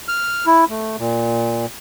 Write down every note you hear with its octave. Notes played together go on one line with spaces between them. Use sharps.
F6
E4
A3
A#2